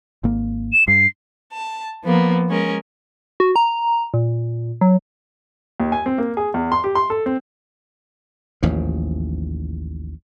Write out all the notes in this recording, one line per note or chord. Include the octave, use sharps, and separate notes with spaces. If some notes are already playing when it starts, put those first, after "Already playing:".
G#1 A#3
E7
G2 C7
A5
F3 A#3 B3
G#3 C#4 A#4
F#4
A#5
A#2
F#3
D#2
G#5
C4
A#3
G#4
E2
C6
G4
C6
A4
C4
A1 D#2 G#2 F3